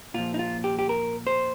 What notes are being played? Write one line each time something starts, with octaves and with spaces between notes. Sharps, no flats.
A#2 F3 F4
D#4
F4
G4
G4
A#4
C5